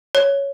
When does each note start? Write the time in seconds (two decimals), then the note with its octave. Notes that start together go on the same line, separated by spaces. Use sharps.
0.15 C#5